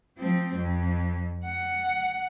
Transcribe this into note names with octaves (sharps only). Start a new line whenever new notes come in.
F3 C4
F2
F#5